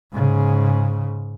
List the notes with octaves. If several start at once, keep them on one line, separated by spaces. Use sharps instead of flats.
G#2 C#3